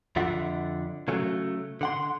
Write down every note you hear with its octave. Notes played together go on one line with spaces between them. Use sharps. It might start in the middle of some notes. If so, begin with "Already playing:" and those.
F2 D3 F4 E5 F#5
C#3 F#3 A3
D3 F#5 C6